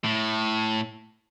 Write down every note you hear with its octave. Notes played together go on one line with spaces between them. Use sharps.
A2